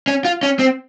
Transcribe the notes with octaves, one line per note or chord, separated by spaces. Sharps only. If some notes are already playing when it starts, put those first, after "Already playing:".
C#4
F4
C#4
C4